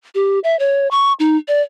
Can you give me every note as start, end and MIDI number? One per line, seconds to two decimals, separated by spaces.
0.15 0.39 67
0.44 0.58 76
0.59 0.89 73
0.91 1.13 85
1.20 1.37 63
1.48 1.62 74